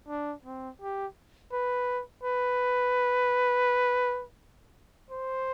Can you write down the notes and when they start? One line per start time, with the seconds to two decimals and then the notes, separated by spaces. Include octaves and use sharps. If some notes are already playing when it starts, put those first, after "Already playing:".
0.08 D4
0.44 C4
0.81 G4
1.52 B4
2.23 B4
5.10 C5